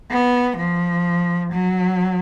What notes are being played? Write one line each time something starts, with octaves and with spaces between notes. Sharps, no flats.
B3
F3
F#3